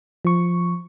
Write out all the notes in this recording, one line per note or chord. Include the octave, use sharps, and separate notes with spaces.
F3 C#6